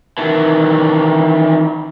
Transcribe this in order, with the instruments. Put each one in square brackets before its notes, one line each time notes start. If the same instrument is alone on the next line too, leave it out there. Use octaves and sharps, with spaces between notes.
[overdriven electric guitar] D#3 E3